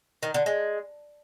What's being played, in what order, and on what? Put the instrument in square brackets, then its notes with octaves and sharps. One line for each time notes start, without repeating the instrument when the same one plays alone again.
[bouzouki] D#3
D3
G#3